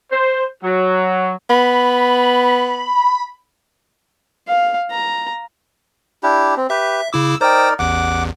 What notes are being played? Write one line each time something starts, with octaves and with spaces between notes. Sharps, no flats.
C5
F#3
B3 B5
F5
A#5
D4 E4 G4
C4
G4 B4 E5
C#3 E4 D6 E6
D#4 A#4 C5 D5 G5
A1 E2 F#5 D6